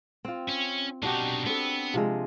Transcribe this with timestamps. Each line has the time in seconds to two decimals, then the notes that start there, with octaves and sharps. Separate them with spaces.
0.25 C4 F4
0.48 C#4
1.03 B2 D4 D#4 F#4 G4
1.46 B3 C4 A4
1.94 C3 F3 G#3